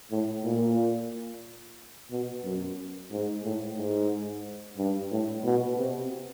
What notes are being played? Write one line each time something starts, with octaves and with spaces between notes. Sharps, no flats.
A2
A#2
B2
F#2
G#2
A2
G#2
G2
A2
B2
C3